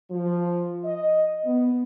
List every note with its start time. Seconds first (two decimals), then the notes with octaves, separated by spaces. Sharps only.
0.11 F3
0.85 D#5
1.46 B3